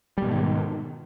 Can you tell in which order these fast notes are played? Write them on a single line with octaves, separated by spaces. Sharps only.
G3 B2 G#2 D#3